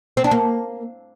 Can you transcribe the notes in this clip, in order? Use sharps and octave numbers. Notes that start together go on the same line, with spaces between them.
C4
D4
A#3